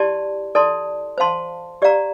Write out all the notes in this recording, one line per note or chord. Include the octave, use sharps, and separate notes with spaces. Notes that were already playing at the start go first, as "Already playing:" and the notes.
Already playing: E4 G4 D5 A5 C6
E4 A4 D5 A5 C6
C5 F5 A5 C6
G4 D5 F5 A#5